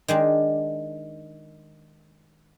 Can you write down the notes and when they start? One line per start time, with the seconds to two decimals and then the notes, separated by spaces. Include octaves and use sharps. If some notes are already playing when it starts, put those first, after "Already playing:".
0.08 D#3 G#3 D4